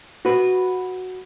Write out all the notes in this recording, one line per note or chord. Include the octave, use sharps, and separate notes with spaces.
F#4 B4